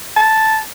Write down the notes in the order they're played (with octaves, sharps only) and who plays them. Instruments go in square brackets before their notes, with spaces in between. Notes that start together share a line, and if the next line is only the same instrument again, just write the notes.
[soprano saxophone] A5